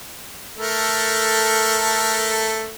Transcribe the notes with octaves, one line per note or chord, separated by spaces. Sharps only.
A3 A4 A#4